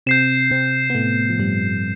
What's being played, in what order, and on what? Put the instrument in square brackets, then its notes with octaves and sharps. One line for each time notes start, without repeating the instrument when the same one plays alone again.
[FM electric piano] C3 C4 [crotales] G6 C7 E7
[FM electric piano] C3 C4
B3
A2 A3
F3
G2 G3